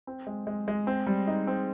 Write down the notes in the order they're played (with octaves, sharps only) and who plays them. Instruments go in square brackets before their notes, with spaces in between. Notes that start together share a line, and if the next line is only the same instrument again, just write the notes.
[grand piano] C4
G#3
G#3
G#3
C4
G3
D#4
C4